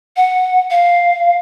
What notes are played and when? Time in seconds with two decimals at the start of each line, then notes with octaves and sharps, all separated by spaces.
0.17 F#5
0.71 F5